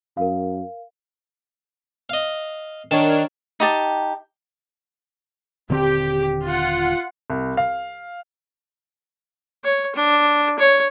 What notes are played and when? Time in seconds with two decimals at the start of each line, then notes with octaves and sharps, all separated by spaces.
0.17 F#2 A#4 F5
2.09 D#5 F5
2.91 D#3 D4 A#4 C#5 A5
3.60 D#4 G4 A5
5.70 D#1 D3 C4 G4
6.44 F4 F#5
7.30 C2
7.57 F5
9.64 C#5
9.95 D4
10.59 C#5